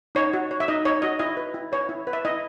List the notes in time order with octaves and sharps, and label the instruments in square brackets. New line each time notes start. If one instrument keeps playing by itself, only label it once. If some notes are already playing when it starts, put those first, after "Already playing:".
[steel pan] D#4 C#5
F#4
C#5
E5
D#4 D#5
D#4 C#5
F#4 D#5
E4 D#5
B4
E4
B4 C#5
E4
B4
E5
E4 D#5